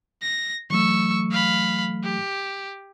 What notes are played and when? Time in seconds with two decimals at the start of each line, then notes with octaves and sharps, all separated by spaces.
0.22 A#6
0.70 E3 F#3 A3 C#6 E6
1.32 F5 B5
2.04 G4